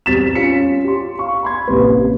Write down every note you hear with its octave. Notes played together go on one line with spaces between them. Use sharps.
E2 G3 C4 A6 B6 E7
C#4 F4 B6 C#7
G4 C6
F5 C#6
B5 C6 G#6
A1 C3 A#3 B4